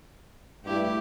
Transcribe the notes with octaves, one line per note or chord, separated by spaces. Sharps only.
G2 A3 E4 G4